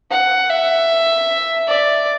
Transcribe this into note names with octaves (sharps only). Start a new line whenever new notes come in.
F#5
E5
D5